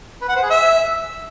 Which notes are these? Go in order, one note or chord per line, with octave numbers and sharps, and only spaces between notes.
B4
F#5
C5
G#4
E5